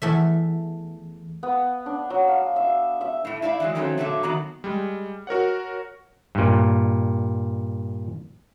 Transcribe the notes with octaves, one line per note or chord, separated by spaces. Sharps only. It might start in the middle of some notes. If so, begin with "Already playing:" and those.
E2 A3 E5
B3
D4
F#3
F5
E5
E5
A2 A3
E4 D5 E5 F5
E3 F#3 G#3
D#3 F3 F#3 A3 C4 C#4
A#2 D3 F#3 A4 E5
D#3 F#3 B3 F#4 A#5
G3 G#3
F#4 A#4 C#5 F#5
G2 A#2